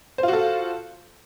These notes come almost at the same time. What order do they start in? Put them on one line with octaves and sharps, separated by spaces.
C5 F4 F#4 A4